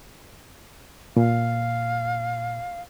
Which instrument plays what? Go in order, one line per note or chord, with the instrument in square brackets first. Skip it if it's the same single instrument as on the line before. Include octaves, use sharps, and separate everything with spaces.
[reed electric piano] A#2 [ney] F5